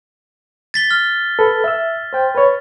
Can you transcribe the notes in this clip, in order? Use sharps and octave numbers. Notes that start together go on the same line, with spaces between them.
A6 B6 G7
F6
A4 B4
E5 E6
C5 G5
B4 C#5